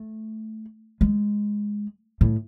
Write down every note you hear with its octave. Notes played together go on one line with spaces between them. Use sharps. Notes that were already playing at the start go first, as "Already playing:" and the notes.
Already playing: A3
G#3
A2